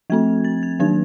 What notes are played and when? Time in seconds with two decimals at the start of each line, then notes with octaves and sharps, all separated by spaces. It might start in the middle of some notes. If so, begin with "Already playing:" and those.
0.10 F3 A3 C4 G#6
0.44 A6
0.63 G#6
0.79 D#3 F#3 A#3 D4 G#6